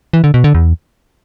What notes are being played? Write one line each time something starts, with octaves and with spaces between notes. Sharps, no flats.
E3
D3
B2
D3
E2